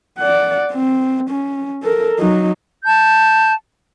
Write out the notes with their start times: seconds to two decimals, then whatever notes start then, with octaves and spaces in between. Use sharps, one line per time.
0.19 D5 F#5
0.72 C4
1.30 C#4
1.83 A4 A#4
2.19 F#3 D#4
2.85 A5 G6